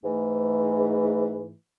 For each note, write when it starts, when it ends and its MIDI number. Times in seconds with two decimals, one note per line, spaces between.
0.04 1.54 44
0.04 1.54 52
0.04 1.54 57